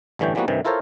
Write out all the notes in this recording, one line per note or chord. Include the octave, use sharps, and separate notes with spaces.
A1 G2 D3 E3 C#5 G5
E3 F3 G3 A#3 B3 F#4
G2 C3 D#3 E3
E4 F4 A4 A#4 C5 C#5